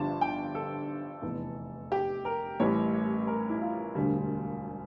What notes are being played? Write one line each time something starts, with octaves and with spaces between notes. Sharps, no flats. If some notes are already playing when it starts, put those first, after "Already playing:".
Already playing: G1 G2 F3 A5
G5
A4
F1 E2 E3
G4
A#4
A1 A2 E3 G3 C#5
A#4
E4
F4
E1 D2 D3 G3